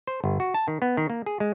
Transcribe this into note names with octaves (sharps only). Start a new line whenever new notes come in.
C5
G1
F#4
A5
D#3
B3
D#3
A#3
G#4
G#3